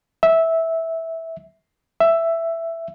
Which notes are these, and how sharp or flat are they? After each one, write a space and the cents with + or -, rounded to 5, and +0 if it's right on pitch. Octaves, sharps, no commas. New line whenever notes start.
E5 -10
E5 +10